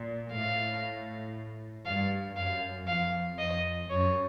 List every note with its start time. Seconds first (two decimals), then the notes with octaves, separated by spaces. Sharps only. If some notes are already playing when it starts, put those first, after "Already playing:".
Already playing: A#2
0.32 A2 F5
1.86 G2 F5
2.36 F#2 F5
2.87 F2 F5
3.39 F2 D#5
3.90 F#2 C#5